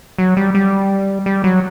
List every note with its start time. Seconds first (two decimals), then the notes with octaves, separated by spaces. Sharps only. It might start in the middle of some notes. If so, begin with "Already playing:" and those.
0.18 F#3
0.37 G3
0.54 G3
1.26 G3
1.44 F#3